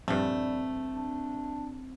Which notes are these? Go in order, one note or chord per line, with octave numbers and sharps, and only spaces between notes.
A#1 G2 G3 A3 C4
D4